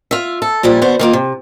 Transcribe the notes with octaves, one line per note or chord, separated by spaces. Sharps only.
F4 E5
A4
A#2 F3 G3 E4
D3 B3 F#4 C5
D#3 A#3 F4
C3